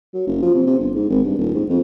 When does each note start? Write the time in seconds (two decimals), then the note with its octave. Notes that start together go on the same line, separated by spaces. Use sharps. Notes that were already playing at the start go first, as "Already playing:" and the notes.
0.14 F#3
0.27 F#1
0.42 F3
0.54 C3
0.67 C3
0.79 G1
0.95 G#2
1.10 G#1
1.24 G2
1.38 D#1
1.55 G#2
1.69 F2